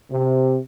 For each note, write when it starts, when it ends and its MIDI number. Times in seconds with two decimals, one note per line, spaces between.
0.12 0.59 48